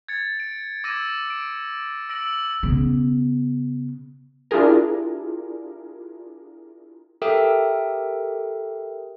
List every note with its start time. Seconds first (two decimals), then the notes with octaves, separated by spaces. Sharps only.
0.08 G#6 A6 C#7
0.40 D7
0.84 D6 E6 G#6 A#6 D#7
1.30 D7
2.09 E6 A#6 D7 F#7
2.63 C#3 B3
4.51 D4 E4 F4 G4 G#4 A#4
7.22 G4 A4 A#4 E5 G5 D#6